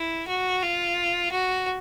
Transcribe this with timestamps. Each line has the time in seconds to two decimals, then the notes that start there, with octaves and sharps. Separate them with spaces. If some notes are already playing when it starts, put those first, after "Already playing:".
Already playing: E4
0.27 F#4
0.62 F4
1.31 F#4